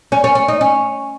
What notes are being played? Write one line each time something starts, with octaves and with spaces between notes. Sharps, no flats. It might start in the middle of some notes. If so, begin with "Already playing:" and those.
C#4
C#4
C#4
D#4
C#4